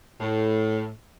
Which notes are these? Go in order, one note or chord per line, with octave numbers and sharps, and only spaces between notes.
A2